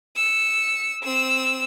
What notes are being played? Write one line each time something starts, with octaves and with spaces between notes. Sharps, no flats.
E6 C#7
C4 E6